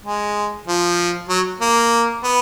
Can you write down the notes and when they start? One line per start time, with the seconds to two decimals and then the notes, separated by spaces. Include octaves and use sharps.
0.04 G#3
0.67 F3
1.29 F#3
1.61 A#3
2.24 B3